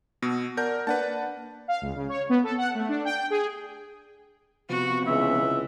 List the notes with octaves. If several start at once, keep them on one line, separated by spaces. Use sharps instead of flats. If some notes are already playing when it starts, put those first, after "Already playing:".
B2 B3 E6
A#4 D5 F#5 A5 G6
A#3 D4 B4 D5 F#5 A5
F5
C#2
C#3
C#5
B3
A4
F#5
A3
D4
G5
G5
G#4
C3 F3 B3 F#4
C#2 E3 E5